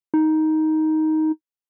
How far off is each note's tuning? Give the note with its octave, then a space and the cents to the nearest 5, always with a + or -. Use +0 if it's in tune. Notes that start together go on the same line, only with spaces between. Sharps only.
D#4 +10